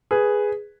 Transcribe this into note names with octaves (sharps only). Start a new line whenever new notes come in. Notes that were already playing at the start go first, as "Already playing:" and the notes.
G#4 B4